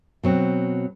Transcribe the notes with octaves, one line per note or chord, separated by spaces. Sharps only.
B2 F#3 C4